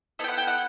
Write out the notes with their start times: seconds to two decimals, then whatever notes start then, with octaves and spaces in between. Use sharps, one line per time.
0.19 B3 E4 A4 E5 G5
0.28 F#5
0.38 G5
0.47 F#5